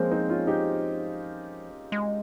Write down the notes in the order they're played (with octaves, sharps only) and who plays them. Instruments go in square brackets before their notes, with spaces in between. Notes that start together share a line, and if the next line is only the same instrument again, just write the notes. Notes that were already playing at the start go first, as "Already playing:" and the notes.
Already playing: [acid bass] F3 [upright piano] G#3 A#3 C4 C#4
[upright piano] C4 D#4
C#4 F4
D#4 G4
[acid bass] G#3